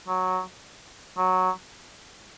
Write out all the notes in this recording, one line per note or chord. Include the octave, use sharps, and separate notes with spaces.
F#3
F#3